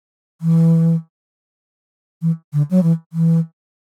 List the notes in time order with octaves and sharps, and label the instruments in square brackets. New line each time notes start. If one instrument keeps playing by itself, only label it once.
[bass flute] E3
E3
D3
F#3
E3
E3